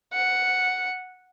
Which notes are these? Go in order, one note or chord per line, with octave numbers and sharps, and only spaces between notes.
F#5